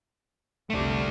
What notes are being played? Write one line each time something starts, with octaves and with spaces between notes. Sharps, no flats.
F1 C2 G3 A3 D4